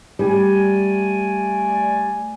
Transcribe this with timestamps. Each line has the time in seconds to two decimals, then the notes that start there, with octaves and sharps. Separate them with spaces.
0.19 G3 A3 D5 G#5